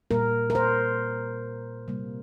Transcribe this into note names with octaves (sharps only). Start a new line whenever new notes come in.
A#2 G3 A#3 A#4
A#4
C5
C3 G3 A#3